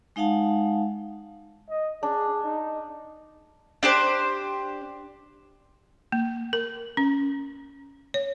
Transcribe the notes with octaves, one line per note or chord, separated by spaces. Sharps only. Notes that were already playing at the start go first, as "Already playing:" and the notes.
G#3 D#4 F5 F#5 A5
D#5
D4 G#4
D#4
D4 G4 C5
A#3
A#4
C#4
C#5